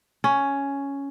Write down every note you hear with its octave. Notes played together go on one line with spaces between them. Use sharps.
C#4